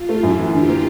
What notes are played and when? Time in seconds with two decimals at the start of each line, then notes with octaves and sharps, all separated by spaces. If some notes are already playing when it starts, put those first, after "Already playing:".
Already playing: F4
0.09 A3
0.23 F#2 E4 F#4
0.38 E3
0.53 D3 F4 G4
0.69 A#3